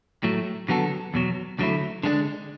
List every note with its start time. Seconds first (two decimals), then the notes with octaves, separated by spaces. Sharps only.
0.23 A2 F#3 A3
0.69 D3 F#3 B3 F#4 A4
1.14 E2 B2 F#3
1.59 D2 D3 F#3 A3 E4
2.03 D3 G#3 B3 D4